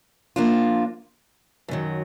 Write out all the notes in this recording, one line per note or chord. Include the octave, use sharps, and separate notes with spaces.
F3 A#3 D4 F4
F#2 D#3 F#3